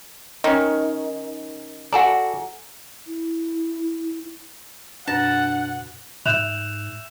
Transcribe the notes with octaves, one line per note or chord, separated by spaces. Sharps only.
D#3 C#4 D#4
F#4 A4 D5 F#5 G#5 A#5
E4
F#2 B2 D4 F#5 A5 A6 A#6
G#2 E5 F#6 G6 E7 F7